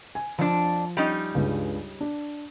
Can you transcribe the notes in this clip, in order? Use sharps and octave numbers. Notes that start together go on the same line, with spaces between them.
G#5
F2 F3 D4
G3 C#4 D#4
C#2 G2 C#3
D4